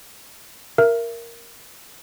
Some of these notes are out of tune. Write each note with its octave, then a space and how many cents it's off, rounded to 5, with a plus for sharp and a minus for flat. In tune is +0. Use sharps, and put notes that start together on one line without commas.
A#4 +0 E5 +30